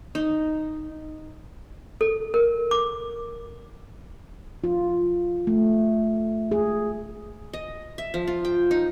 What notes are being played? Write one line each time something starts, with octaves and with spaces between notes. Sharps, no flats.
D#4
A4
A#4
D6
F4
A3
G#4
D#5
E5
F3
F4
G5
D#4